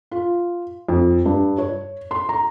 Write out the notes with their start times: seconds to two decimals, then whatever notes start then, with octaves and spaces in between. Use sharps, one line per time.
0.11 F4
0.89 F2
1.26 G2
1.58 C#5
2.11 C6
2.29 A#5